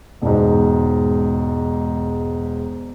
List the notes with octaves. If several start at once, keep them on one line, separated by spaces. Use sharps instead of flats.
E1 G#2